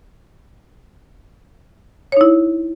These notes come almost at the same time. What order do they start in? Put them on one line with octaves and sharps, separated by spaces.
C#5 D#4 E4